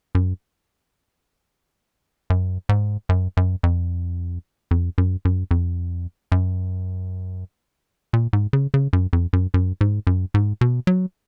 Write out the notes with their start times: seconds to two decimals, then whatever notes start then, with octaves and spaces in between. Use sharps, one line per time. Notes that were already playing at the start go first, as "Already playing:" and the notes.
0.15 F#2
2.30 F#2
2.69 G#2
3.09 F#2
3.37 F#2
3.63 F2
4.71 F2
4.98 F#2
5.25 F#2
5.51 F2
6.32 F#2
8.13 A#2
8.33 G#2
8.53 C#3
8.74 C#3
8.93 F#2
9.13 F2
9.33 F#2
9.54 F#2
9.81 G#2
10.07 F#2
10.34 G#2
10.61 B2
10.87 F#3